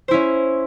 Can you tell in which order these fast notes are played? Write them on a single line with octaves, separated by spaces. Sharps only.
C5 E4 C#4